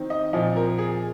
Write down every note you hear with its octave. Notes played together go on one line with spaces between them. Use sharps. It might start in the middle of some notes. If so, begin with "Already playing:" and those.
Already playing: D#3 C4
D#5
A#2 F3 C4 D#5
A#4
G#4